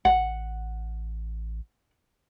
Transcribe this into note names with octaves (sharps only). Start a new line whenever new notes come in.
A1 F#5